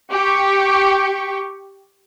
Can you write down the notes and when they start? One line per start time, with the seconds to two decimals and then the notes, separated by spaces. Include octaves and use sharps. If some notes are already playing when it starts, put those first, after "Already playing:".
0.11 G4 C#6